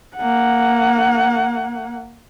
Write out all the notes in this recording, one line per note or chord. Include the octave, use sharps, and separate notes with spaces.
A#3 F#5